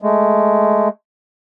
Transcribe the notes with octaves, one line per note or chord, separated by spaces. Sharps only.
G#3 A3